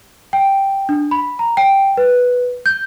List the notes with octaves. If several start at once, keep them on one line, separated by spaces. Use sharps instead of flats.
G5
D4
B5
A#5
G5
B4
G6